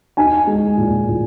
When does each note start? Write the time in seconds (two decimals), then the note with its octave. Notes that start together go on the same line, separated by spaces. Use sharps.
0.17 D#4 G#5
0.47 G#3
0.78 A#2
1.09 A#2